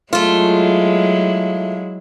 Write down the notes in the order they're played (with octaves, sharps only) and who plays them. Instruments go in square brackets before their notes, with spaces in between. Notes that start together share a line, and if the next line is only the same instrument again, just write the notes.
[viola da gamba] F#3 G#3 E4 [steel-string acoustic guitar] A3 F4